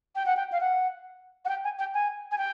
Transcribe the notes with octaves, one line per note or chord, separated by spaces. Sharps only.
G5
F#5
G5
F5
F#5
F#5
G5
G#5
G5
G#5
G#5
G5